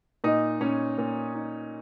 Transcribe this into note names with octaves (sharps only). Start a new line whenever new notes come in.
A#2 D#4 D#5
A#2 C#4 C#5
A#2
D#4